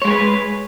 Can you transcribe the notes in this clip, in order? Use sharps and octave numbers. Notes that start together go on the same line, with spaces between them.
G#3 G#4 B4 C#5